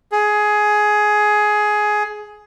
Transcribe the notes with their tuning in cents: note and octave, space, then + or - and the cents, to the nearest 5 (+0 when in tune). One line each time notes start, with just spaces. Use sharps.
G#4 +15